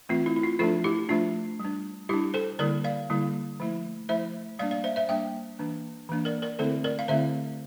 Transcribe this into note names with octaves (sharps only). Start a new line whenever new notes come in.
E3 A3 C4 F4
E4
E4
F4
F3 A3 D4 F4 A4
E4 G4
F3 A3 D4 F4
G3 D4
G3 D4 E4 G4
A4 C5
D3 G3 A#3 E4 A#4 D5
D5 F5
D3 G3 A#3 E4
F3 A3 E4
F3 A3 E4 C5 E5
G3 A#3 D4 D5 F5
D5 F5
C5 E5
C5 E5
G3 A#3 D4 E5 G5
E3 A#3 D4
E3 A#3 D4
A#4 D5
A#4 D5
D3 A3 C4 E4 A4 C5
A#4 D5
F5
D3 A3 C4 E4 C5 E5